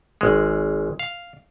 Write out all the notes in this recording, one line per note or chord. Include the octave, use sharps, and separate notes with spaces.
G#1 G#3
F5